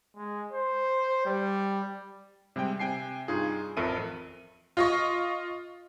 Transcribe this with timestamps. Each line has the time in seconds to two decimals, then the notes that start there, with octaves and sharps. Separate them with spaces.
0.16 G#3
0.52 C5
1.25 G3
2.56 C3 G3 G#3 G5
2.79 C3 G5 G#5 C7
3.28 G2 D#4 F4 G#4
3.77 A1 F2 A4 A#4 E5 D#7
4.77 F4 D#5 C#6